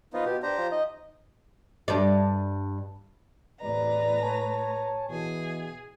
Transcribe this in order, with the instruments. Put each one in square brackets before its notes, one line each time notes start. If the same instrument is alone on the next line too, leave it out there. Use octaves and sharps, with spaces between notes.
[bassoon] F3 [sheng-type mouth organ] B3 D#4 F4
[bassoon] B2 [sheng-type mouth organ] G4
[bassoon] D4 [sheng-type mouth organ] G4 C5 A#5
[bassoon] F3
[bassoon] D#4 [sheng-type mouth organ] D#5
[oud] G2 D5
[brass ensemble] E2 C3 D5 [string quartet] A2 B4 A#5
[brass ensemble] C#5 G#5 A5
[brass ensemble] B2 E3 [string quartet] G#4 G#5